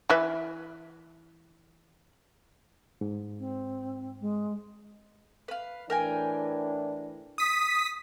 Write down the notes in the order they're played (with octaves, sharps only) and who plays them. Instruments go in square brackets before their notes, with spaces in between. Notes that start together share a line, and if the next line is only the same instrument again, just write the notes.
[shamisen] E3 B4 E5
[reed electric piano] G#2
[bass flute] C4
G#3
[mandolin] B4 F5
[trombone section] A2 E3 D4 [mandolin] A#4 G5 G#5
[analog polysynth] D#6 B6